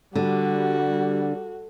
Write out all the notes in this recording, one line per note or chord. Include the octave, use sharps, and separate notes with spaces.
D3 G3 F#4